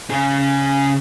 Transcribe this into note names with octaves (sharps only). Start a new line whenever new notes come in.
C#3 G#4